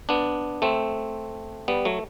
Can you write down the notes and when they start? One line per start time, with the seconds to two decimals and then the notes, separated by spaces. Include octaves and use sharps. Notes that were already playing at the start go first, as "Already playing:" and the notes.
0.09 B3 D4
0.62 A3 C4
1.68 G3 B3
1.85 F#3 A3